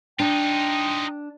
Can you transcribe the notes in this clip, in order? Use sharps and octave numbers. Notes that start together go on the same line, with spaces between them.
D4 D#4 F4 G5